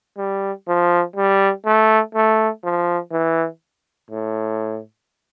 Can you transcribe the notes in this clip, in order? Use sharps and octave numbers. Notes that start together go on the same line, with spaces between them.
G3
F3
G3
A3
A3
F3
E3
A2